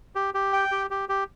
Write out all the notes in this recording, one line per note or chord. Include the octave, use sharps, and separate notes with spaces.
G4
G4
G5
G4
G4
G4